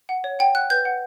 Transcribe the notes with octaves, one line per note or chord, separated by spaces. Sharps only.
F#5
C#5
F#5 G5
F#5 F#6
B4 G6
F#5